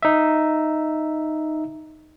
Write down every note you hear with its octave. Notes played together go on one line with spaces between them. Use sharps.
D#4 E5